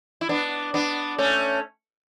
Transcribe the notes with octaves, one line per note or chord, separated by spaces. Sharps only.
E4
B3 D4
B3 D4
A3 C#4